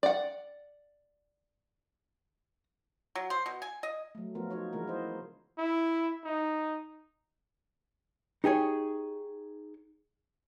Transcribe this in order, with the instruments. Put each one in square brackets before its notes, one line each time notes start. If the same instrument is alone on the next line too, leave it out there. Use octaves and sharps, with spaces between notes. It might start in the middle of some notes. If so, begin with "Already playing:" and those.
[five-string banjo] D5 F#5
[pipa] F#3
C5
B2
G#5
D#5
[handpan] F#3 A3
F3 A3 B3 F4 A#4
D#4 F4 F#4 C#5
C#3 E3 G#3 A#3 E4 A#4
C5 D#5
[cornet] E4
D#4
[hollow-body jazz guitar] D#4 G4 G#4 C#5